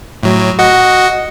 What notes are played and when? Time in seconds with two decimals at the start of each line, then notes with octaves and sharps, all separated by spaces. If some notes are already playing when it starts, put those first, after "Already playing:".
0.23 A2 F#3
0.59 F#4 D#5 F#5